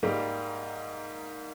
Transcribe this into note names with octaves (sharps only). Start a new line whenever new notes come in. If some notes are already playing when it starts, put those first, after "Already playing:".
G#2 G3 A#3